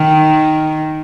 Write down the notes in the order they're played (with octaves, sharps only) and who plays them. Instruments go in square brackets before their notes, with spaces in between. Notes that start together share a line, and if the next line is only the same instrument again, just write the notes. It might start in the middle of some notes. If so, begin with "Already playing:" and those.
Already playing: [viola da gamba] D#3